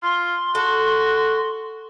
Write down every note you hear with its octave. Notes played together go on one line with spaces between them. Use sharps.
F4 C6
F#4 A4